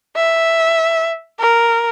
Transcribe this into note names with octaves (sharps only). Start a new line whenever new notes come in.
E5
A#4